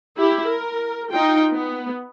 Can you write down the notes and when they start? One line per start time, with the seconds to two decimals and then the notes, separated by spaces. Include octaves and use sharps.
0.17 E4 G4
0.48 A#4
1.10 D#4 F4 G5
1.51 B3